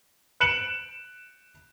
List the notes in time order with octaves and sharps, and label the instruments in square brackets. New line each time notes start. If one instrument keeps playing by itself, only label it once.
[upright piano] F#6 C#7 D7 E7 F#7